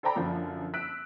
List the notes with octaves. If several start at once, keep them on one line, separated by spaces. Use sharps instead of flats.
A4 C5 D5 G5 A#5 B5
F#2 D3 F3
E6 F#6 B6 D7